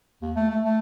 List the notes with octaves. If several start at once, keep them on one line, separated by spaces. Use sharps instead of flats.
D#2
A3
A3
A3